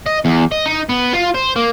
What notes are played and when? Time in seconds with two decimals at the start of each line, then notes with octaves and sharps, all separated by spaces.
0.06 D#5
0.25 E2
0.52 D#5
0.66 D#4
0.89 B3
1.13 F4
1.34 C5
1.56 A#3